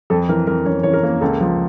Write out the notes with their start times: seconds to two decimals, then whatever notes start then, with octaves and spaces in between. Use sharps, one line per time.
0.10 F2 A4
0.29 E3 A#4
0.47 F2 A#4
0.66 F2 C#4 C#5
0.83 E3 C#5
0.94 A#4
1.04 A#3
1.21 C#2 A4
1.41 F3